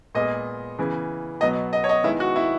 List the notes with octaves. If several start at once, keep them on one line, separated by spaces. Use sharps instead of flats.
A#2 G#3 B3 D#5
C#3 E3 B3
B2 F#3 B3 D#5
D#5
C#5
D#5
D#3 G#3 B3 E4
F#4
E4